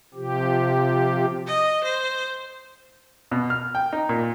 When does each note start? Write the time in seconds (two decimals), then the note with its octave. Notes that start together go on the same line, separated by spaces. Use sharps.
0.14 C3 F3 G4
1.47 D#5
1.85 C5
3.31 B2
3.50 F6
3.75 G5
3.93 D#4
4.09 A#2